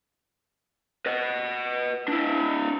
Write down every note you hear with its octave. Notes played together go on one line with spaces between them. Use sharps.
B4 D#5
D4 E4